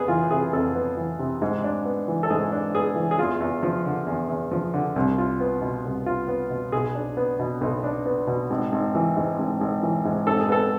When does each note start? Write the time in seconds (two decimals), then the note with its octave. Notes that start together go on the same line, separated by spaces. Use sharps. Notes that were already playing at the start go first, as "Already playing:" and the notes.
Already playing: F2 B3 G#4
0.08 E3 F4
0.31 C3 G#4
0.53 F2 A4
0.75 B3
0.97 E3
1.19 C3
1.42 G#2
1.64 D4
1.85 B3
2.08 E3
2.23 A4
2.30 G#2 G#4
2.52 D4
2.75 B3 G#4
2.96 E3
3.11 G#4
3.18 E2 F4
3.40 E2
3.63 F3
3.85 D3
4.07 E2
4.29 E2
4.51 F3
4.74 D3
4.96 C2
5.18 F4
5.40 B3
5.62 B2
5.85 C2
6.06 F4
6.28 B3
6.50 B2
6.72 B1 G#4
6.95 D4
7.17 B3
7.39 B2
7.61 B1
7.84 D4
8.06 B3
8.27 B2
8.50 G#1
8.72 G#1
8.95 E3
9.17 G#2
9.39 G#1
9.61 G#1
9.83 E3
10.05 G#2
10.27 G#1 A4
10.40 G#4
10.49 B3 A4